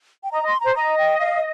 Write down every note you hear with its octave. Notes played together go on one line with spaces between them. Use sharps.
G5
D#5 A#5
D#5 C6
C5 A#5
D#5 A#5
G5
F5